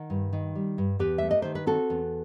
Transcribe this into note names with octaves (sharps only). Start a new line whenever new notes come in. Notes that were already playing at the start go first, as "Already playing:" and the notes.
Already playing: D#3 F#5
G2
D#3
G3
G2
E2 G4 B4
A3 E5
D#5
D#3 C5
B4
C4 F#4 A4
E2